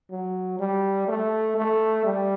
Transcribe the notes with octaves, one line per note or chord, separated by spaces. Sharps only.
F#3
G3
A3
A3
G3